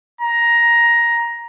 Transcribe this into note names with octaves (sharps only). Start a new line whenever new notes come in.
A#5